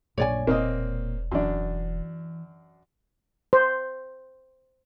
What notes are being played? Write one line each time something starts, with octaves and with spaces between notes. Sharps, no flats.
A#1 F#2 C#5 D5 G#5
E1 A#2 A#3 C4 D#5
F#2 E3 D4
C5